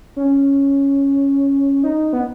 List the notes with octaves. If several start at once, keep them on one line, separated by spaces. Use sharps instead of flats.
C#4
D#4
B3